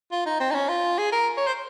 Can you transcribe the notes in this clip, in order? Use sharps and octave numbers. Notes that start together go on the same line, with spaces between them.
F4
D#4
C4
D#4
C#4
F4
G#4
A#4
C#5
C5